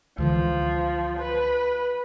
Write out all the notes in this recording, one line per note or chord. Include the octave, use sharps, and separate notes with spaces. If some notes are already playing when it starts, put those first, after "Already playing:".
C#2 D3 E3 F3
B4